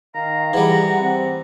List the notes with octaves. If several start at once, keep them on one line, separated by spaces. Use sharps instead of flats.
D#3 F5 A#5
E3 G3 G#4 F#5
C4